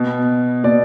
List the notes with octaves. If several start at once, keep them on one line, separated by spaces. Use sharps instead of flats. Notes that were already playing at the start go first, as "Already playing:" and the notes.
Already playing: B2
B2 D5